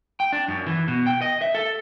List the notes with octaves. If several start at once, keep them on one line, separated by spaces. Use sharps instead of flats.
G5
D4
F#2
E3
B2
G5
D#5
E5
A4